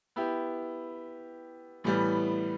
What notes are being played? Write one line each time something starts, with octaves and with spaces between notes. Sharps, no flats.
B3 E4 G4
A2 E3 G3 B3